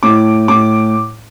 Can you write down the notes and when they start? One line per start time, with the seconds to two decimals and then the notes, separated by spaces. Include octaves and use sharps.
0.03 A2 D6
0.48 A2 D6